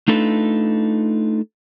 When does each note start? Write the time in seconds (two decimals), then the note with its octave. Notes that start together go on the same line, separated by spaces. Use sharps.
0.08 A3 D4 D#4 F4 A4 B4